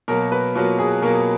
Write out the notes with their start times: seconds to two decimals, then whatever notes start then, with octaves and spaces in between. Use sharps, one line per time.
0.08 B2 F#3 A#3 A#4
0.32 B4
0.55 B2 F#3 A#3 F4
0.79 G#4
1.02 B2 F#3 A#3 A#4